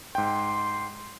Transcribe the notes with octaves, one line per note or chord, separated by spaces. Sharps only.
G#2 G5 C6